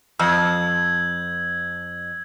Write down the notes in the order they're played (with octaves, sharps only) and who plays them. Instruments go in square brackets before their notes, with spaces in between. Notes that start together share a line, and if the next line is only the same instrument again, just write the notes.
[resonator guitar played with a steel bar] F2 [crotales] E6 G6 G#6